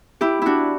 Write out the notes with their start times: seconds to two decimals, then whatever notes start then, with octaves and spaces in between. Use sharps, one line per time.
0.21 E4 G4
0.42 D4 E4 F#4